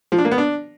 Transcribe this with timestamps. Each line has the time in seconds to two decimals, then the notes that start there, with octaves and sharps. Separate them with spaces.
0.12 F3
0.18 D4
0.25 A#3
0.31 B3
0.38 D4